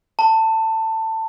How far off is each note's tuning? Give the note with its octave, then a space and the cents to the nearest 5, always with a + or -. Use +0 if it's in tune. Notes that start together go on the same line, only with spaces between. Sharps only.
A5 +20